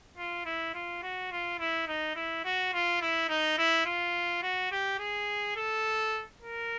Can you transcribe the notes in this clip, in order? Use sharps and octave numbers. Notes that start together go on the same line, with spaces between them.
F4
E4
F4
F#4
F4
E4
D#4
E4
F#4
F4
E4
D#4
E4
F4
F#4
G4
G#4
A4
A#4